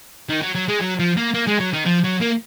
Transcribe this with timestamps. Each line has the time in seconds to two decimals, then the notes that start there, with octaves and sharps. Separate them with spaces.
0.29 D#3
0.42 F#3
0.55 F#3
0.69 G#3
0.81 F#3
0.99 F3
1.17 A#3
1.34 A#3
1.47 G#3
1.60 F#3
1.73 D#3
1.86 F3
2.04 F#3
2.21 A#3